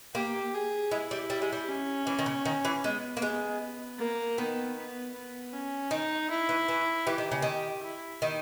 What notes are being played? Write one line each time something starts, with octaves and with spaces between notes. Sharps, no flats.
A#3 G4
G#4
G#3 E4
G3
G3
G#3
G3
C#4
E3
D#3
C#3
D#3
E3
G#3 B3
A#3
G#3
A#3
D#3 B3
B3
B3
C#4
D#3 D#4
E4
E3
E3
E3 G4
D#3
C#3
D#3
E4
D#3